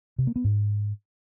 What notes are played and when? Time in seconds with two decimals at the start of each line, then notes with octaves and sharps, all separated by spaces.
0.18 C3
0.27 A#3
0.36 B3
0.44 G#2